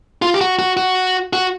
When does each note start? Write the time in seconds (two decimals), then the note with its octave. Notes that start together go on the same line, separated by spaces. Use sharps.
0.22 F4
0.34 G4
0.41 F#4
0.59 F#4
0.77 F#4
1.33 F#4